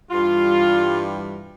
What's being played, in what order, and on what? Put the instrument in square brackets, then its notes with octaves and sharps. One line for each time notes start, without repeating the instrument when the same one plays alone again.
[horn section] G2 E3 G3 F4